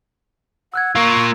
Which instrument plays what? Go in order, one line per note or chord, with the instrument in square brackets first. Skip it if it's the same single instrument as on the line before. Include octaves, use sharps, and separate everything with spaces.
[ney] F#5 [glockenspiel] E6 F#6 G#6
[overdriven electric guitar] A#3 F4 [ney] C#6 [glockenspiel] E6